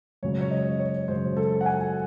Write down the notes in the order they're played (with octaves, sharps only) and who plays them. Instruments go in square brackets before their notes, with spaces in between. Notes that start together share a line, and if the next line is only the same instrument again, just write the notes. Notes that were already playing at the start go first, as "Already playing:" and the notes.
[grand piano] F#2 C#3 G#3 C#5
C#5
D#5
C#5
F#2 C#3 G#3 C5
A4
F#5
G#5